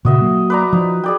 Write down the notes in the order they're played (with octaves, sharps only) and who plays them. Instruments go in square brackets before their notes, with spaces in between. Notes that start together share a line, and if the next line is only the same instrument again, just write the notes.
[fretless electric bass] A#2 C#3 [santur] F#4 D#5 E5
[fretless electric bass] F#3 A#3
[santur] B4 D5 A#5
[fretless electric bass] F3 [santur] D#4
[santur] G#4 D5 G5